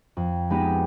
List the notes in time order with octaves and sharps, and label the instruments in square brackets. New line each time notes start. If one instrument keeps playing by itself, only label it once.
[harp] F2
G#3 B3 D#4 G4 B5 D#7